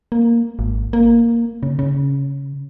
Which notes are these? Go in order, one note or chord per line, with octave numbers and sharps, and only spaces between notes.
A#3
G#1
A#3
C#3
C#3